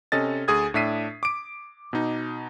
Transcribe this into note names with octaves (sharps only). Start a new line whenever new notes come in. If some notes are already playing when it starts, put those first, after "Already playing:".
C3 C#4 A4 D#5 A6
D2 G#4 D#6 G#6
A2 D4 E5 B6 C7 D#7
D6 D7
B2 D#4